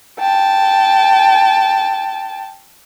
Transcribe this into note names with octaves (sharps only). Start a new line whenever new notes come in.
G5 A5